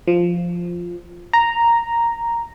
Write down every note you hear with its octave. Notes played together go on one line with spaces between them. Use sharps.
F3
A#5